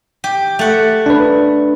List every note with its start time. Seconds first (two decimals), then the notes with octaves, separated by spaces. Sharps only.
0.24 G4
0.59 A3 F#5
1.06 D4 B4